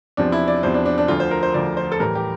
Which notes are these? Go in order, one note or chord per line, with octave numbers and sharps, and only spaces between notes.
E2 C3 F3 D4
E4
D5
E2 C3 F3 C5
D4
D4
D4
D2 D3 F3 F4
C5
A#4
C5
D2 D3 F3 D5
C5
A4
A2 E3 G3 A#4
G4